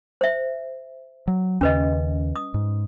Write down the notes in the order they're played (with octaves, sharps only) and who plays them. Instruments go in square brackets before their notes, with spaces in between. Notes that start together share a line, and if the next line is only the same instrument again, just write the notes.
[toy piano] C5 E5
[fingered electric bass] F#3
[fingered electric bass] D#2 C#3 [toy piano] C#4 B4 D#5
[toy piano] D#6
[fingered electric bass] G#2